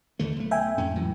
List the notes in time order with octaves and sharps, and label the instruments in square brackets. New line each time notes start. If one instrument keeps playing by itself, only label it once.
[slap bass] D#2 D3 A3
B1 A3
[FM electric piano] E5 G5 G#5
[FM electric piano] F2 [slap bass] G#2 C#4
[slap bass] A2 E3 F#3